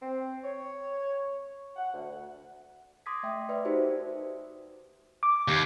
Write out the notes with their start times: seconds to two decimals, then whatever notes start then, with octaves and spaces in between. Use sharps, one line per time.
0.01 C4
0.44 C#5
1.77 F#5
1.94 D2
3.06 C6 D6 D#6 G#6 A#6 B6
3.23 A3 E5 G5 D#6
3.49 B4 D5 E5
3.65 D#4 F#4 G4 A#4 C5
5.23 D6
5.48 D#2